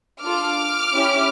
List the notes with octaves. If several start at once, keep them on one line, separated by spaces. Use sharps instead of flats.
D4 F4 A4 D6 F6
C#4 E4 G4